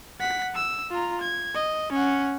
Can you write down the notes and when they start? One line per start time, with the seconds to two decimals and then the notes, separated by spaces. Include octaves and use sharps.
0.20 F#5 B6
0.55 E6
0.91 F4 A#5
1.21 G#6
1.55 D#5
1.92 C#4 F#5